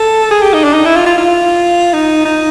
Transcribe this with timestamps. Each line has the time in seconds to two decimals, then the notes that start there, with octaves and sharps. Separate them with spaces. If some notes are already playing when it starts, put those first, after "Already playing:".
Already playing: A4
0.31 G#4
0.42 G4
0.53 D#4
0.64 D4
0.74 D#4
0.85 E4
0.96 F4
1.06 F4
1.18 F4
1.93 D#4
2.25 D#4